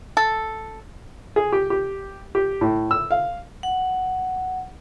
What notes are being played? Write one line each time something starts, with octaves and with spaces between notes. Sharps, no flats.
A4
G#4
G4
G4
G4
A2
E6
F5
F#5